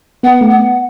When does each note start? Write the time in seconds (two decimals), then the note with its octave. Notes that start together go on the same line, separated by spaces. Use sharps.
0.23 B3 F#5
0.41 A3
0.50 F#5
0.59 B3